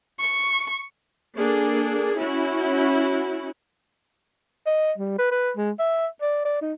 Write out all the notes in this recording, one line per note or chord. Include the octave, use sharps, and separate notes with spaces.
C#6
A#3 D4 G#4 A4
C#4 E4 F#4
D#5
G3
B4
B4
G#3
E5
D5
D5
D#4